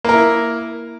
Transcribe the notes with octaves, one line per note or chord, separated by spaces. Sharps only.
A#3 E4 A#4